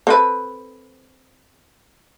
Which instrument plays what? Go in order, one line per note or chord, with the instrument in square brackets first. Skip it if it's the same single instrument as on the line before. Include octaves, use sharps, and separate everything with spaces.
[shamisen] C4 A4 B4